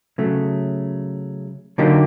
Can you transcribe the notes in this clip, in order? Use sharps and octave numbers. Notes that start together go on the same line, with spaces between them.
C#3 F#3 A3
D3 F#3 A#3 D#4 G4